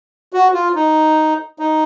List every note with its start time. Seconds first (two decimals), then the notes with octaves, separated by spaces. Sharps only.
0.33 F#4
0.54 F4
0.75 D#4
1.59 D#4